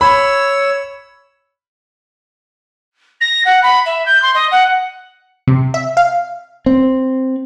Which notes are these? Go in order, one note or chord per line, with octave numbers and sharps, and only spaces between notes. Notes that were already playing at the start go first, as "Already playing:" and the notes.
C#5 B5 E6
A#6
F#5
B5
E5
G6
C6
D#5
F#5
C3
E5
F5
C4